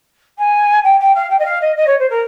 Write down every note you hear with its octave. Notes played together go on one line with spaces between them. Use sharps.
G#5
G5
G5
F5
G5
D#5
F5
D#5
D#5
C#5
C5
A#4